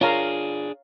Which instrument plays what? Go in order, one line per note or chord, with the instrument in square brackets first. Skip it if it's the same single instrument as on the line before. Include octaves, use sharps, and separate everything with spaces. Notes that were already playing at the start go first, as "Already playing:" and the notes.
[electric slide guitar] D4 G#4 [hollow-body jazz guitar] F4 A#4 [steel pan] C#5 F5 A#5